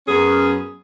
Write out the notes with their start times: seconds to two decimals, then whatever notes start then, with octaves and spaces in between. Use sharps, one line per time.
0.07 F#2 B3 C#4 G#4